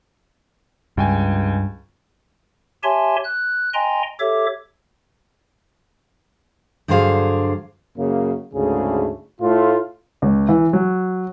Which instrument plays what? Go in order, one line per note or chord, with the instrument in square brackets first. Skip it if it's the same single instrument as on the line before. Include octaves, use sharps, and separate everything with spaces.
[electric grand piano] C#2 G5 G#5 [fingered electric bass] G2
[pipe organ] G4 C#5 E5 G#5 A5 C6
F#6
D#5 G5 G#5 A#5 C6
G4 A4 C#5 E5 D6
[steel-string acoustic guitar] G2 D3 F#3 G#4 C5 F5
[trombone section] F#2 C#3 A#3
D2 G#2 C#3 A3 G#4
A2 A3 F4
[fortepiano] C#2
E3
F#3